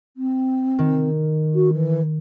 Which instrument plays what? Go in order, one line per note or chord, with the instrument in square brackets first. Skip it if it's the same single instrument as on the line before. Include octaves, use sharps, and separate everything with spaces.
[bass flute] C4
[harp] D#3
[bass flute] F#4
E3